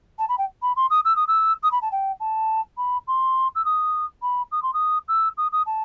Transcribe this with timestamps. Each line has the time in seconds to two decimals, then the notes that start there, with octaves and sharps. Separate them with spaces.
0.18 A5
0.29 B5
0.38 G5
0.62 B5
0.76 C6
0.90 D#6
1.05 E6
1.16 D#6
1.27 E6
1.63 D#6
1.72 B5
1.82 A5
1.92 G5
2.20 A5
2.77 B5
3.07 C6
3.55 E6
3.65 D#6
4.22 B5
4.51 D#6
4.62 C6
4.73 D#6
5.08 E6
5.37 D#6
5.52 D#6
5.66 A5